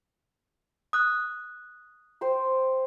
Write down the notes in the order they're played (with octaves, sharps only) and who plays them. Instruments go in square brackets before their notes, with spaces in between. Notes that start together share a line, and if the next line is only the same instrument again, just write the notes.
[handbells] D#6 F#6
[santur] C5 G5 C6